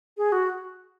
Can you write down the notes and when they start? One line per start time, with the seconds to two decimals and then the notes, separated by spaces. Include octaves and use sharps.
0.18 G#4
0.32 F#4